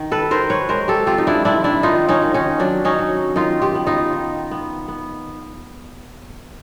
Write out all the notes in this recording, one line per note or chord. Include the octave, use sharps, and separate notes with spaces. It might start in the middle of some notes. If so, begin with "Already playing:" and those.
Already playing: D#3
A4 B4
D#3 A#4 C5
B4 C#5
G#3 A#4 C5
G4 A4
C4 F4 G4
D#4
D4 E4
D#3 D4 E4
D4 E4
D#3 D#4 F4
C#4 D#4
D#3
C#4 D#4
F#3 D4
C#4 D#4
F#3
D#3 D#4 F4
F4 G4
B3
D#4 F4
D#3
B3
B3